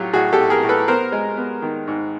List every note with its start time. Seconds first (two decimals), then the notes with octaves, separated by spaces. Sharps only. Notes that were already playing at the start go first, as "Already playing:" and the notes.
Already playing: A2 F#3 A3 F4 G4
0.13 A2 F#4 G#4
0.33 G4 A4
0.39 A2
0.50 G#4 A#4
0.63 A2
0.69 A4 B4
0.87 B3 A#4 C5
1.12 G#3
1.37 B3
1.62 D#3
1.87 G#2